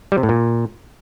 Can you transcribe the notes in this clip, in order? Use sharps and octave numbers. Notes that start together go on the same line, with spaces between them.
G3
C3
A2
A#2